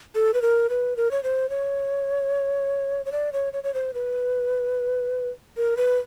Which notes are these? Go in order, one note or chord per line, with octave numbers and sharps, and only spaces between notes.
A4
B4
A#4
B4
A#4
C#5
C5
C#5
C#5
D5
C#5
C#5
C#5
C5
B4
A#4
B4